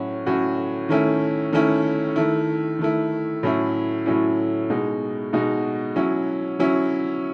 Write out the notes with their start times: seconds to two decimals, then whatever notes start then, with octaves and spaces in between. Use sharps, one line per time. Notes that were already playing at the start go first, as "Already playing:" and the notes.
Already playing: A2 F#3 C#4 F#4
0.26 A2 F#3 C#4 F#4
0.89 D#3 A3 C#4 E4
1.52 D#3 A3 C#4 E4
2.16 D#3 A3 E4
2.79 D#3 A3 E4
3.43 A2 F#3 C#4 E4
4.06 A2 F#3 C#4 E4
4.70 B2 G#3 D#4 F#4
5.33 B2 G#3 D#4 F#4
5.96 F#3 C#4 E4
6.59 F#3 C#4 E4